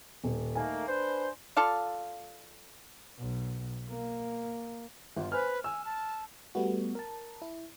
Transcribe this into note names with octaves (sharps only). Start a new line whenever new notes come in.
D#1
D#3 A3 A#3 G#5
D4 B4 C5
F4 A4 D5 F5
B1
A#3
G1 F4
B4 C5 G#5 F6
G#5 E6
A5
G3 A3 B3 F#4
A#4 A5
E4